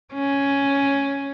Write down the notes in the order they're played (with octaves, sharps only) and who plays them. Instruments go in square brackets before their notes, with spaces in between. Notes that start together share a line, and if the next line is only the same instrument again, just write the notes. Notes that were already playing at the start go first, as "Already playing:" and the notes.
[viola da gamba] C#4